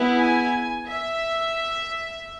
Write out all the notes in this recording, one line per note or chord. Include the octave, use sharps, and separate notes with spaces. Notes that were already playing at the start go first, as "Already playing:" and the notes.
Already playing: B3 E4 G#4
G#5
E5